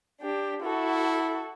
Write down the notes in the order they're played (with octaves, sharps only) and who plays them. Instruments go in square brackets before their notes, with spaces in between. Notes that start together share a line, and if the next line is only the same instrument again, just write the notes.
[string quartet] D4 G4
[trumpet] E4 [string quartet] F#4 A4